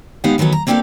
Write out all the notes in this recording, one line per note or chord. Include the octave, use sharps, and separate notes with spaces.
G#3 B3 D#4 G4 F5 F#5
D#3 E3 F#3 A3 B3
A#5
A#3 C4 D4 G4 A4 F5